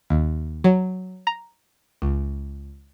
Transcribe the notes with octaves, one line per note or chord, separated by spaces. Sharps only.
D#2
F#3
A#5
C#2